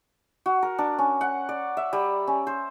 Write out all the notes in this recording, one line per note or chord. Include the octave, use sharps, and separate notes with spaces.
F#4
A#4
D4
C#4
F#5
D5
E5
G3
C#4
C5